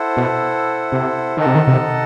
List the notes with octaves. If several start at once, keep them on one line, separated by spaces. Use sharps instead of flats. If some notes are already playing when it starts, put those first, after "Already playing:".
Already playing: E4 A4 C5 F#5
B2
C3
D#3 D#4 A4 D#5 F#5 A5
C3
D#3
C3